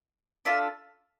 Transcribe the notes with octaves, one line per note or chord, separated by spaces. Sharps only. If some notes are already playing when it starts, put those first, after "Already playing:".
D4 F4 A4 E5